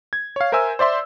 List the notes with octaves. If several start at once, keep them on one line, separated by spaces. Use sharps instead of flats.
G#6
C#5 F5
A#4 C5 E5 G#5 E6
C5 D5 E5 C6